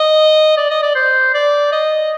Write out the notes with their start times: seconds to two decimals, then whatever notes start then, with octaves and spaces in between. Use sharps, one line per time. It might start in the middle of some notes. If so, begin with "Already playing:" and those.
Already playing: D#5
0.57 D5
0.71 D#5
0.82 D5
0.95 C5
1.34 D5
1.72 D#5